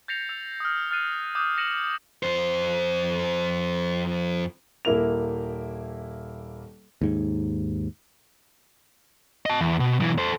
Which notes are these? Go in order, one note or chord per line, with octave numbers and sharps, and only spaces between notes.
G6 A6 A#6 C7 C#7 F7
E6 F7
D#6 F6
F6 F#6 A6 C7 D#7
D6 D#6 G6
A#6 C#7 D#7 E7 F#7
F2 C5
D#1 A#3 E4 A#4 F7
D#2 G#2
D#5 A5
E2
B2
B1 E3
A4 C5